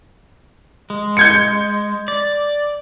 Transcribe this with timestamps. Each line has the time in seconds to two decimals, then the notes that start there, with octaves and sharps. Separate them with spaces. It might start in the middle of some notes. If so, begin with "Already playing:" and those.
0.90 G#3
1.17 G6 G#6 C#7
2.08 D5